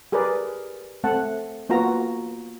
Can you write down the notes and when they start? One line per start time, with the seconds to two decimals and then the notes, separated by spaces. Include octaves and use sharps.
0.12 G4 G#4 A#4 B4 D5
1.04 A3 C4 F#5 A5
1.69 A#3 B3 F4 F#4 A#5